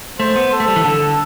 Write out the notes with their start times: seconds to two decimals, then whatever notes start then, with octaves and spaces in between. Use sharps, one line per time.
0.20 A3 C5
0.36 B3
0.53 A4
0.60 A3
0.68 G3
0.76 E3
0.84 D3 A4